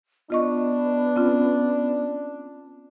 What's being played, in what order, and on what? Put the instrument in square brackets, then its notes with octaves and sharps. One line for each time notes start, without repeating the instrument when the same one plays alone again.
[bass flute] B3 [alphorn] D4 [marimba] F4 D#5 C#6
[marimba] C4 C#4 F4